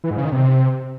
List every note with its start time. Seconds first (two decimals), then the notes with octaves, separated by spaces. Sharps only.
0.04 E3
0.11 G#2
0.18 C#3
0.25 D#3
0.32 C3